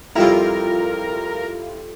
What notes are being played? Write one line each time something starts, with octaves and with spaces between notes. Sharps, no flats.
F2 G3 C4 E4 F4 A#4